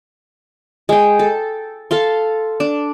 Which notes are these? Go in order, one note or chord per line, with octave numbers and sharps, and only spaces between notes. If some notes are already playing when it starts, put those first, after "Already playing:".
G#3 G5
A4
A4 F5 C6
D4